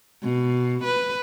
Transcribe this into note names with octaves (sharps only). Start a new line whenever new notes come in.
B2
B4